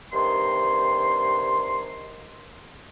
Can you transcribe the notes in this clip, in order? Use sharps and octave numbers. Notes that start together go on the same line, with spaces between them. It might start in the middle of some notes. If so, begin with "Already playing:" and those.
G2 C3 D#3 C6